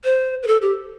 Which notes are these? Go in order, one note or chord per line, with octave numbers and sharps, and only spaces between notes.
C5
B4
A4
G4